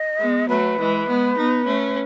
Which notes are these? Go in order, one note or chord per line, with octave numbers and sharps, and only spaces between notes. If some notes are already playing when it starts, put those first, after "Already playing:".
Already playing: D#5
G#3 B3
F#3 A3 B4
E3 G#3
G#3 B3
B3 D#4
A3 C#4